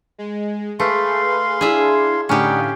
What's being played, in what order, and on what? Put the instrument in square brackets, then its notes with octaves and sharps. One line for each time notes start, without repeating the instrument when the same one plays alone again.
[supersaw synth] G#3
[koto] A3 [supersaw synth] G#4 B4 [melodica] F5 C6
[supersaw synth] D4 E4 [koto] G#4 E5
[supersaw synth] A2 D3 F5 [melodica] G3 D#4 F#5 [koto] C#4 G4